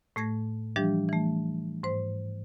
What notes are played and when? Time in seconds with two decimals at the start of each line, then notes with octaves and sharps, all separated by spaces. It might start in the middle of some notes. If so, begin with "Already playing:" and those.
0.16 A2 A3 G#6 A#6
0.76 E3 F3 G3 D4 G4
1.09 E3 A3
1.83 G#2 C5